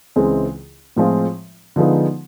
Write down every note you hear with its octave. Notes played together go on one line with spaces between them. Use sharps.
C#2 C#3 E3 G#3 C4
A2 F3 G#3 C4 F4
D3 F3 G#3 B3 D#4